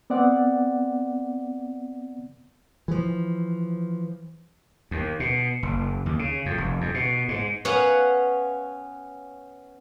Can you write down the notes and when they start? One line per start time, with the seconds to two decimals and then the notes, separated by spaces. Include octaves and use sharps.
0.10 B3 C4 D5 F#5
2.88 E3 F3
4.91 D#2
5.20 B2
5.63 F#1
6.06 D#2
6.19 C#3
6.46 F2
6.58 F1
6.81 F2
6.94 B2
7.29 G#2
7.65 B3 C#4 B4 C#5 F5 F#5